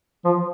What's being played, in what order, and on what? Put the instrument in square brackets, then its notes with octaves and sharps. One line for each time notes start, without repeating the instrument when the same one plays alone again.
[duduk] F3